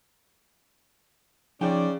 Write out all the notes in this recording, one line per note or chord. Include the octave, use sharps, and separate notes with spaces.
C#3 F3 C#4 D#4 D5 G5